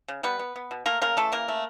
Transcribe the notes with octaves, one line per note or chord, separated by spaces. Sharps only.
C#3
G3 B3 B4
B3
B3
B2
A3 A#3 A#4
C#3 A#3 A#4
E3 A3 A4
C#3 A#3 A#4
A3